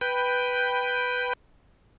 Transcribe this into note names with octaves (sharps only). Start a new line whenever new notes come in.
B4 G5